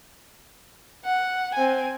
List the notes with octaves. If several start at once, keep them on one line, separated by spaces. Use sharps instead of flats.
F#5
C4 G#5